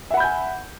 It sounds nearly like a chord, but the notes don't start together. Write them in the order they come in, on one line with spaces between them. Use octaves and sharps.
E5 F#5 B5 G6 G#5